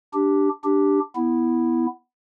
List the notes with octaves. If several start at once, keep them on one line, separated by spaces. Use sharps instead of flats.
D4 G4
D4 G4
B3 E4